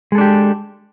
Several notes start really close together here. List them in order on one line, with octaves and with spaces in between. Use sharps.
G#3 A4 D4 G4